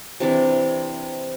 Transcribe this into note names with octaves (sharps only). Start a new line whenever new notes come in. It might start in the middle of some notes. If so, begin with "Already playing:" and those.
C3 E3 D4